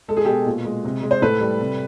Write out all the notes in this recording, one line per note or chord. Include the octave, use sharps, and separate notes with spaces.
G#3 A4
G#4
B2 G4 A4
A#2
G#3
C3
G#3
C5
A2 A4 B4
G3
C3